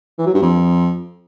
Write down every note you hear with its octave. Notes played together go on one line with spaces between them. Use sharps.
E3
F#3
G2
F2